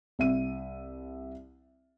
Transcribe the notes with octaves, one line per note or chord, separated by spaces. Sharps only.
C2 E5 D#7